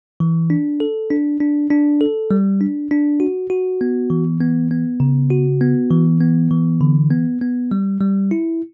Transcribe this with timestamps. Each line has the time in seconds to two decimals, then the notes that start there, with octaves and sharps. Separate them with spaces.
0.20 E3
0.50 D4
0.80 A4
1.10 D4
1.40 D4
1.70 D4
2.01 A4
2.31 G3
2.61 D4
2.91 D4
3.20 F#4
3.50 F#4
3.81 B3
4.10 E3
4.41 B3
4.71 B3
5.00 C#3
5.30 F#4
5.61 B3
5.90 E3
6.21 B3
6.51 E3
6.81 D3
7.11 B3
7.41 B3
7.71 G3
8.01 G3
8.31 E4